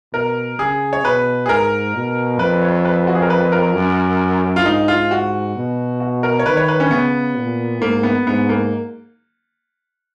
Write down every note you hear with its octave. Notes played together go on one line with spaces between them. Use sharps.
B2 A#4
C#3 G#4
C#5
B2 B4
G#4
G#2 A#4
B2
F2 B4
C#5
B4
F#4
G#4
A#4
B4
A#4
F#2
F4
G#2 D#4
F4
F#4
B2
F#4
A#4
C#5
D#3 B4
C#5
B4
C#4
C#3 B3
A#2
G#2 A#3
B3
G#2 B3
A#3